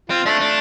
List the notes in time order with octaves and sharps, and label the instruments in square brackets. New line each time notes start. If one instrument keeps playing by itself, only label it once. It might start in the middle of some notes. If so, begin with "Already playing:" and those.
[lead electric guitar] C4 [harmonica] F4
[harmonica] A3 [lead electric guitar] D4
[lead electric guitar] D4